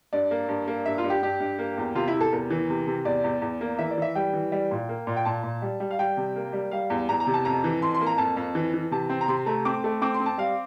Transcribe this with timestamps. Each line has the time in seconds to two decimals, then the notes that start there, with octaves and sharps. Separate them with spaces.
0.13 G2 D5
0.31 A#3
0.49 G2
0.68 A#3
0.86 G2 E5
0.98 F4
1.04 G2
1.10 G4
1.23 G2 G4
1.40 G2
1.59 A#3
1.78 E2
1.95 C3 F4
2.08 E4
2.13 C3
2.21 A4
2.32 E2 A#4
2.50 E3
2.69 C3
2.87 C3
3.05 E2 D5
3.24 E2
3.42 E2
3.61 A#3
3.79 E3 E5
3.90 D5
3.98 E3 E5
4.15 G3 G5
4.33 E3
4.52 G3
4.71 A#2
4.89 A#3
5.07 A#2
5.17 G5
5.25 A#2 A5
5.43 A#2
5.62 G3
5.80 G3
5.91 F5
5.99 G3 G5
6.17 C3
6.36 A#3
6.53 G3
6.71 G3 F5
6.90 E2
7.09 E2 A#5
7.20 A#5
7.27 C3
7.34 A5
7.45 F2 A#5
7.64 E3
7.82 F2 C6
7.94 C6
8.01 A#3
8.07 A#5
8.18 F2 A5
8.37 F2
8.55 E3
8.74 E3
8.91 C3 A5
9.10 C4
9.21 A#5
9.28 C3 C6
9.46 A3 A#5
9.65 C4 D6
9.84 A3
10.02 C4 D6
10.14 C6
10.20 C4
10.26 A5
10.38 G3 F5